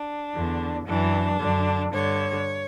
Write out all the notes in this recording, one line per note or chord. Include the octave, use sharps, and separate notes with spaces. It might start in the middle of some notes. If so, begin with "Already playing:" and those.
Already playing: D4
E2 D3
F#2 E3 D4
F#2 D3
G2 D3 C#5